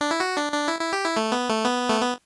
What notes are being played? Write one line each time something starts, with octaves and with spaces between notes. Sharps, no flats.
D4
E4
F#4
D4
D4
E4
E4
G4
E4
A3
B3
A3
B3
A3
B3